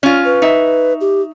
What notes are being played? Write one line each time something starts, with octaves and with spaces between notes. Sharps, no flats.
C#4 F4
B4
D#4 E5
G4